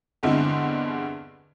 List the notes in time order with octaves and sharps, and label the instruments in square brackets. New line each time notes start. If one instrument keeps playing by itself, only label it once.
[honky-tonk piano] E2 G2 D3 G#3 C4 E4